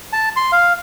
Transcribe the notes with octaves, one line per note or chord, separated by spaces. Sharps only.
A5
C6
F5